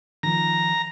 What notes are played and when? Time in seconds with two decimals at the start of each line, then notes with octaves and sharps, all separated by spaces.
0.23 D#3 F3 A#5